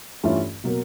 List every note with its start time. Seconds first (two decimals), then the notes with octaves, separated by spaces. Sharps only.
0.24 G2 E3 A3 C#4 F4
0.64 B2 F#3 A#3